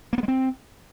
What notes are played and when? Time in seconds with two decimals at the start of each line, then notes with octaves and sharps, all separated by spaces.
0.13 A#3
0.18 B3
0.23 G#3
0.28 C4